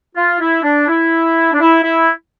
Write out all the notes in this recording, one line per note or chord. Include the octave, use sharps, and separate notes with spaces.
F4
E4
D4
E4
D4
E4
E4